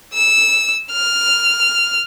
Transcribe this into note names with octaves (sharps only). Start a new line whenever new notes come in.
E6
F6